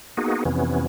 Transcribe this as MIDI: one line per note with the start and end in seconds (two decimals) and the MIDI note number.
0.17 0.44 58
0.17 0.44 59
0.17 0.44 63
0.17 0.44 66
0.17 0.44 68
0.45 0.87 41
0.45 0.87 48
0.45 0.87 52
0.45 0.87 59
0.45 0.87 61